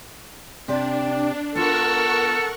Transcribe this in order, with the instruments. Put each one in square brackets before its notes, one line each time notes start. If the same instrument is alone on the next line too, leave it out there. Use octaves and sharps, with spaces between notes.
[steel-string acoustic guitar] C3 G4 D5 [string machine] D4
[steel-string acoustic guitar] B3 F4 [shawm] A4 [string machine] A#4 F#5 C#6